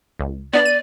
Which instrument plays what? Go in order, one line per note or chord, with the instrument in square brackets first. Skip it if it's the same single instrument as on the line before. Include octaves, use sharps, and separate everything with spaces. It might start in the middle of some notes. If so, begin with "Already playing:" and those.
[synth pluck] C#2
[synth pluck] B3 D4 [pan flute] D5
[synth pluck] D#7